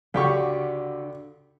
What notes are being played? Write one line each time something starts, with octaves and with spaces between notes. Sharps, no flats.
C#2 D3 F#4 G4 C#6